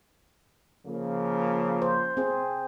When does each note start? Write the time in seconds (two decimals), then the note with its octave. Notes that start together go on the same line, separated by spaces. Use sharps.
0.87 C#3 F3 A#3
1.82 C5
2.17 C4 G#4 C5